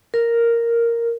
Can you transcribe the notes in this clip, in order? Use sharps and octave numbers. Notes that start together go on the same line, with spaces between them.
A#4